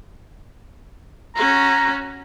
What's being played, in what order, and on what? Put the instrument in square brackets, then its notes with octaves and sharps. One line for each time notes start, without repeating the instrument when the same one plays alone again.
[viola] C#4 F#4 [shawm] A#5